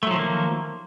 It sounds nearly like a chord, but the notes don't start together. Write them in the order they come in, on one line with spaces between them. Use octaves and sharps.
A3 F#3 F3 D#3 A#3